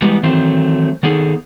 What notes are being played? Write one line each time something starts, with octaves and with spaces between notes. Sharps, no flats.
E3 G3 G#3 B3
D#3 E3 F#3 A3 C4 C5
D#3 B3 D#4 G#4 A4